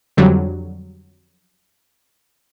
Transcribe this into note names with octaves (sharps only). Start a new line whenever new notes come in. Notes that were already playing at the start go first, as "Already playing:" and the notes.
F2 D3 F#3 G3